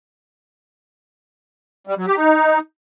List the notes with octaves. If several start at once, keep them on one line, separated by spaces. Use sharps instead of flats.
G3
F#3
G4
D#4